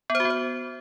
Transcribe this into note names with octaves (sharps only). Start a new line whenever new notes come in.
B3
C5
F#4
B3
C5